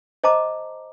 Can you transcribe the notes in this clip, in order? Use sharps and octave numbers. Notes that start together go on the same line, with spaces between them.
C5 D#5 A5 A#5 D6